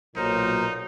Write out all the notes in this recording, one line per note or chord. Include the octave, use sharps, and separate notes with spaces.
B1 A#2 F#3 D#4 A#4 C5